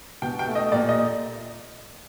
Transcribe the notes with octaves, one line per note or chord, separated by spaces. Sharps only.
B2 G5
G5
A3
D#5
A#2 D5
D#5